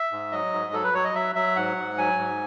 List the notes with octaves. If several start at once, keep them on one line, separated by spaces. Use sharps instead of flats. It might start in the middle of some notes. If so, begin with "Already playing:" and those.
Already playing: E5
G#2
F#3 D#5
G#2
F#3 A4
B4
F#3 C#5
D#5
F#3 E5
F#3 E5
G#2 F#5
G#2
F#3 G#5
G#2